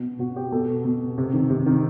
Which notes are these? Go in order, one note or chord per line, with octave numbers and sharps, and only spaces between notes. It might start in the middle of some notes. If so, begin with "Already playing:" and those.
Already playing: B2
B2 F#4
G4
B2 A4
B2
C3
D#3
C3
D#3